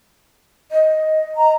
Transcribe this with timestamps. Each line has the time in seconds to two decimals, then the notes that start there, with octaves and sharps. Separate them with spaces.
0.71 D#5
1.35 A#5